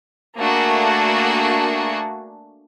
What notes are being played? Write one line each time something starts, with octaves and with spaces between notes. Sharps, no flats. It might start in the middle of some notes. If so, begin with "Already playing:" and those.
A3 A#3 D4 F#4 G#4